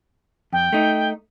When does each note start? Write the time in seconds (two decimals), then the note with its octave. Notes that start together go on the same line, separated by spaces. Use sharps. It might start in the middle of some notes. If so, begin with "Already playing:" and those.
0.53 F2 G5
0.73 A3 D#4